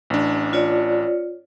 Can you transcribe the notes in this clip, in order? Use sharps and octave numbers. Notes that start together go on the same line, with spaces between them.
A1 D4
F4 C#5 D5